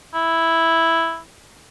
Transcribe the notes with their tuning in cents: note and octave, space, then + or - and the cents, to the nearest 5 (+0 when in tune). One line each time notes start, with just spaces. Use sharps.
E4 +0